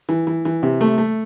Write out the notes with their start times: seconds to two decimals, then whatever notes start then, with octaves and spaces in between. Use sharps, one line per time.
0.09 E3
0.27 E3
0.45 E3
0.63 C3
0.81 A3
0.98 A3